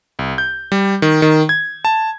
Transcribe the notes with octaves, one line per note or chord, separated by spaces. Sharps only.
C2
G6
G3
D#3
D#3
G#6
A5